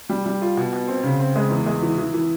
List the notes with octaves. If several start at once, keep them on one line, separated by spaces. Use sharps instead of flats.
G3
G3
F4
B2
B2
C4
C#3
C4
G#3
E2
G#3
E3
E3
E3